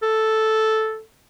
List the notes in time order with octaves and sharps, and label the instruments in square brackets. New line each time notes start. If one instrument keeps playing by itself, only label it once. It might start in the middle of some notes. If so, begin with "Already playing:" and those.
[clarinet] A4